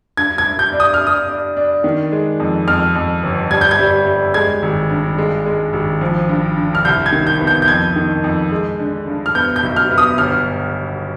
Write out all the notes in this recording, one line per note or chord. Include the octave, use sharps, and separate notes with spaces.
G2 G#6
G#6
G2
G6
D4
D#6
F6
D4
D#6
D4
D4
D#3
G#3
F2
F2 F6
F2
G1
G3 G#6
G6
G#6
G3
G3
G#3 G#6
G#1
G2
G#3
G#3
G#1
F3
G2
D3
F6
C2 G6
G#6
D#3
G6
B3
G6
G6
F2 G#6
D#3
F2
G#3
D3
G2
F6
B3 G6
G6
B1
F6
B3
D#6
G1 F6